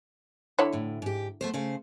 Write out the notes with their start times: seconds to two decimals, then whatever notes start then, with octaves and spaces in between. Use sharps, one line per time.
0.59 D3 E4 C#5
0.73 D2 A2
1.02 G#2 G4
1.41 A3 B3 C5
1.54 C#3 A3 C5